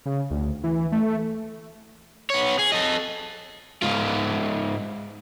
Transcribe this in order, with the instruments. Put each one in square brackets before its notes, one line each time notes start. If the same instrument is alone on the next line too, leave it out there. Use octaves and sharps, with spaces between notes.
[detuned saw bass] C#3
D2
E3
A3
[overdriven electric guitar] B3 C#5
G#4
A4 D#5
G#2 F4